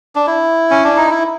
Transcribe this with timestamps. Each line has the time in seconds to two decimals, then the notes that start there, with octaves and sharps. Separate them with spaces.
0.16 D4
0.27 E4
0.71 C#4
0.84 D4
0.97 D#4
1.10 E4